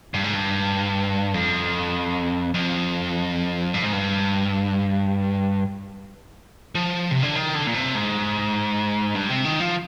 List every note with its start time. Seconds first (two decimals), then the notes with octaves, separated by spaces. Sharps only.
0.14 G2
0.24 G#2
0.34 G2
1.34 F2
2.54 F2
3.74 G2
3.84 G#2
3.93 G2
6.75 F3
7.11 C3
7.23 D3
7.35 D#3
7.55 D3
7.67 A#2
7.74 C3
7.95 G#2
9.15 G2
9.30 C3
9.45 D#3
9.60 F3